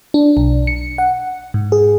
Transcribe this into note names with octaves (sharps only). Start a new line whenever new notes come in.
D4
B1
C#7
F#5
G#2
G#4